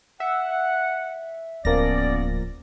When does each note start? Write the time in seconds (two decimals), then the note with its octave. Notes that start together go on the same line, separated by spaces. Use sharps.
0.20 E5 F#5
1.65 D1 F3 A#3 B3 C#4 D5 A#6